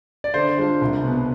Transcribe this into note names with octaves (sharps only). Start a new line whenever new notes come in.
D5
D3 C5
G#3 D4 F4
C2
B2 B3